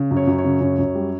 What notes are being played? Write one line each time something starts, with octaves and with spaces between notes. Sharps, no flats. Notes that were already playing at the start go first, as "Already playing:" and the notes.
Already playing: C#3
F#2
C#5
F#2
C#5
C#3
F#2
F#2
G3